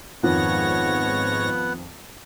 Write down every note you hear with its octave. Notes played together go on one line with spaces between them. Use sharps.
F2 G#2 D#3 F3 B3 C#5 F#5 A#6